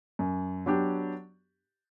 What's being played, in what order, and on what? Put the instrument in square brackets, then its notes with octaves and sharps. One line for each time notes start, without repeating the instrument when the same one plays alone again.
[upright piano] F#2
F#3 B3 D4 G4